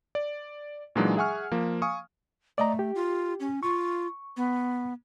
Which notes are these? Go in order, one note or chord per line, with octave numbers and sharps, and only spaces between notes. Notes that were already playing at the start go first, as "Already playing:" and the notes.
D5
A#2 E3 F#3 G#3 D4 D#4
G#4 E5 F#5 G#5 C#6 F6
F3 A#3
F5 G#5 C#6 D#6
A3 D5 D#5 A#5
G4
F4
C#4
F4 C#6
B3